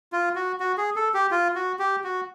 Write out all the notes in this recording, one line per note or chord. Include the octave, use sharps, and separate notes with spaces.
F4
F#4
F#4
G#4
A4
G4
F4
F#4
G4
F#4